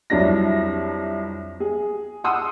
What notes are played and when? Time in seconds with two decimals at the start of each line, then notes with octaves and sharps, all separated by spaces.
0.10 C2 F2 F#3 D4 E4 A#6
1.60 G#4
2.24 F#5 C6 D#6 E6